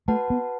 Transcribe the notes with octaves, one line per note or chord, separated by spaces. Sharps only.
A3 F#4 B4 F#5 A5
B3